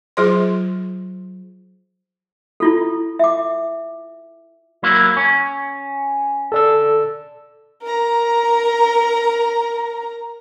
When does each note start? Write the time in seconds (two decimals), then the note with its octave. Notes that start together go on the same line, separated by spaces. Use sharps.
0.17 F#3 F4 G#4 C5 C6
2.60 E4 F4 A4
3.19 E5 D6
4.83 F#3 A#3 E4
5.17 C#4
6.52 A4 D5 E6
7.82 A#4 A#5